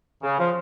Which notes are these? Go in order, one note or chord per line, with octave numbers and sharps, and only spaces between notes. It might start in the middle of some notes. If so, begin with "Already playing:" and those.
C#3
F3